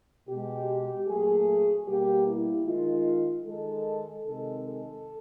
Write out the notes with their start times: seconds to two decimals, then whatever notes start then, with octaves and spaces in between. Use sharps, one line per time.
0.29 B2 G#3 G4
1.07 A#2 F#3 A3 G#4
1.86 B2 G3 A#3 G4
2.26 E4
2.65 D#3 G#3 F4
3.44 D#3 G#3 A4
4.23 C3 D#3 G#3 A4
4.62 A4